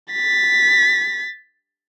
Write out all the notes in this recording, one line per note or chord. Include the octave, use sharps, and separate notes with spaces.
A6 B6